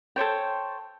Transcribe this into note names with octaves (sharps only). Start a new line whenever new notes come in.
A4 C5 C#5 G5